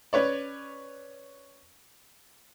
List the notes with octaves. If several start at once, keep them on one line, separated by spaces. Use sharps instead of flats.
C#4 B4 C#5 D5